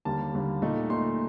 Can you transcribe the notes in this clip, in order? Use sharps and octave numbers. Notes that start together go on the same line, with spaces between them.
D#2 D3 G3 A#3 A5
D#2 D3 G3 A#3
A#2 A3 D#4
A#2 A3 D#4 C6